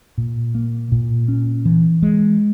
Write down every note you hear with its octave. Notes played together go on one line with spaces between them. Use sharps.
A#2
A#3
A#2
C#4
E3
G#3